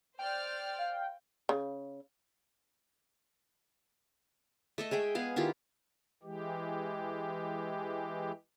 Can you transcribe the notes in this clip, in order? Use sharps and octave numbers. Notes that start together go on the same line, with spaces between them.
C5 D5 G5 F6
F5
C#3
A3 A4 D#5
G#3 G#4 E5 G5
B3 G#4 F5
D#3 E4 F4 G4
E3 G#3 G4